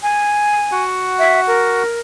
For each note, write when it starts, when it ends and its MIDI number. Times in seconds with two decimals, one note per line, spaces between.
0.03 0.84 80
0.72 1.83 66
0.72 1.83 78
1.19 1.40 76
1.47 2.00 70